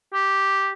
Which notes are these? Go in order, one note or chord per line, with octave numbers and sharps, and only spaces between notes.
G4